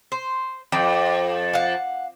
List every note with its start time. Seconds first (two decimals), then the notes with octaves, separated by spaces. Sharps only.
0.12 C5
0.72 F2 G5
1.53 F5 F#5